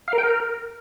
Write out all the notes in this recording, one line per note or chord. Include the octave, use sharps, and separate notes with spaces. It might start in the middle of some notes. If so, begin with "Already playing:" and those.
F5
A#4
G5
A#4